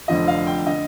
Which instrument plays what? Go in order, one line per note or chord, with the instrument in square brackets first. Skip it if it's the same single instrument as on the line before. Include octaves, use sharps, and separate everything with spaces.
[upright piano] F1 F2 D3 F3 D#5
F5
G5
D3 D#5